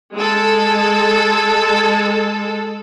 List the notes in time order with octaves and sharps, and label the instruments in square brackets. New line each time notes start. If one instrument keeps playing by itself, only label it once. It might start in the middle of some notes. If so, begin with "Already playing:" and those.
[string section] G#3 A4